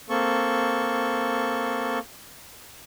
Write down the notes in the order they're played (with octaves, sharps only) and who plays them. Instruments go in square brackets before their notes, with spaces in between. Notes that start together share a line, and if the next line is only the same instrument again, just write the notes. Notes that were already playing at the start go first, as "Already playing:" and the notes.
[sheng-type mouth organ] A#3 C4 A4 C#6